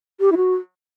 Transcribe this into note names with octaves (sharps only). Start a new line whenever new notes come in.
G4
E4
F#4